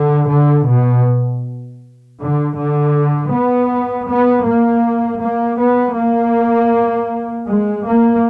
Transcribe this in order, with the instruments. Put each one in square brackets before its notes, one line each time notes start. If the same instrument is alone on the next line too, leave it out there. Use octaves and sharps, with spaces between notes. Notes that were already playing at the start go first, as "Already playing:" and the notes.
Already playing: [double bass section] D3
D3
B2
D3
D3
B3
B3
A#3
A#3
B3
A#3
G#3
A#3